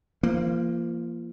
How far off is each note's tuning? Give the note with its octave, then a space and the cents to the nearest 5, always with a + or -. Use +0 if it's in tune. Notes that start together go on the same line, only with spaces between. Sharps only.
F3 -35 A#3 -5